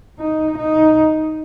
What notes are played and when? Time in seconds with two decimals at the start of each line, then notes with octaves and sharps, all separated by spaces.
0.20 D#4
0.59 D#4